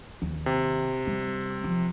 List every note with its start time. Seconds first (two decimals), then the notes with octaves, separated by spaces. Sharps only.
0.22 D#2
0.46 C3
1.07 G3
1.64 F3